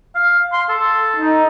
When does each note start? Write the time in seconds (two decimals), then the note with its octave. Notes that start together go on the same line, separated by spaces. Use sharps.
0.15 F5
0.53 C6
0.69 A4
1.16 D#4